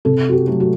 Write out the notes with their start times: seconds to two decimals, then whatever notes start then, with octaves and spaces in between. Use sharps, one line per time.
0.05 C3 A4
0.29 F#4
0.33 G4
0.46 F#3 A3
0.60 F#4